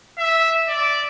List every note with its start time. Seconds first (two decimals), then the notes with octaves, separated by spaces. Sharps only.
0.19 E5
0.69 D5